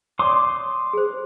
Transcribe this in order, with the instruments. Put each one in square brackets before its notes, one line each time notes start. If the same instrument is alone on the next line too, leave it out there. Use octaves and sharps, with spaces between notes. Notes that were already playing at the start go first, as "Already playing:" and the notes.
[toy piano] C#5 D5 [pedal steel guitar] C6 D6 D#6
[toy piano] G#4 C5